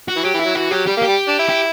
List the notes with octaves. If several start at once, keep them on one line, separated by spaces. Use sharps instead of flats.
F#4
E3
F#3 G4
E3
E4
F#3
E3 F#4
F#3 G4
G3 G4
A#3
G4
G3
D4
E4
G4